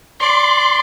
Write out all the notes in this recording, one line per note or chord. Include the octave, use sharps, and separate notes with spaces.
D5 C6